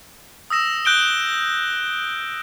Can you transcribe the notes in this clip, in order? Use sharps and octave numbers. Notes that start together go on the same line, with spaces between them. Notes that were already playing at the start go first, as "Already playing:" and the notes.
D#6 E6 A#6 E7
F#6 G6 D7 G7